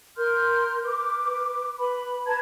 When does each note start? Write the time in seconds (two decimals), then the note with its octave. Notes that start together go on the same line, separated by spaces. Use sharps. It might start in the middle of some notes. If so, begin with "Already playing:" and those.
0.17 A#4 C6 F6 G6
0.83 B4 D6
1.78 B4 B5
2.26 B4 A5 A#5 G#6